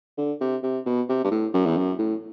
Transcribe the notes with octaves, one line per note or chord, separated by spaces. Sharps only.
D3
C3
C3
B2
C3
G2
A2
F#2
E2
F#2
A2